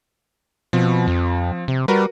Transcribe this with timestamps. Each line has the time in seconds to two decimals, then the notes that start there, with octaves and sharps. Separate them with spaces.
0.73 B2 F3 C4
1.08 F2
1.68 C3
1.88 G3 F#4 A#4 B4